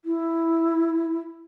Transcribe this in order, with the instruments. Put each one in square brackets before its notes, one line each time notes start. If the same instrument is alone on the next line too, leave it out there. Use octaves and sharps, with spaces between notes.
[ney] E4